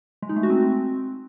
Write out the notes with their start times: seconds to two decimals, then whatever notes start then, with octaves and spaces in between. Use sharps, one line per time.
0.22 G#3
0.29 D#4
0.36 A3
0.43 F#4
0.50 C4